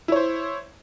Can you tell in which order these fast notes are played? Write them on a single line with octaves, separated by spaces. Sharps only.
E4 C#5 C5